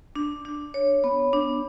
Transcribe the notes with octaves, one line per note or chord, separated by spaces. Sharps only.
D4
D4
C#5
B3
D4